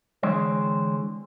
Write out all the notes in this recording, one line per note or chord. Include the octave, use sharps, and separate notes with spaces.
D3 E3 G#3 C4 C5 C#5